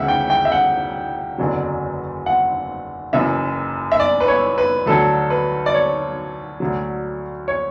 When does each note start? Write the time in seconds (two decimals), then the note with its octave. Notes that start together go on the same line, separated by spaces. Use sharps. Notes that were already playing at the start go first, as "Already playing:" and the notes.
Already playing: D2 C#3 E3 E5 F#5
0.08 G5
0.30 G5
0.45 E5
0.52 F#5
1.38 F#1 E2 D3 F#3
2.26 F#5
3.13 F#1 F#2 E3 E5
3.92 E5
4.00 D5
4.20 B4
4.28 C#5
4.58 B4
4.86 D2 D3 F#3 A4
5.30 B4
5.66 D5
5.74 C#5
6.60 D2 D3 F#3
7.48 C#5